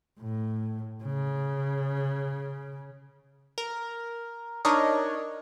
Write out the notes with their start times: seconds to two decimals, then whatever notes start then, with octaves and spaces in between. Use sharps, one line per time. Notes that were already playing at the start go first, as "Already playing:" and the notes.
0.20 A2
1.04 C#3
3.58 A#4
4.65 D4 D#4 A#4 C#5 D#5